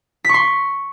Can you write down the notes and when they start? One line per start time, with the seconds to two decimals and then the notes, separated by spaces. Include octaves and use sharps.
0.24 B6
0.29 C#6
0.34 C6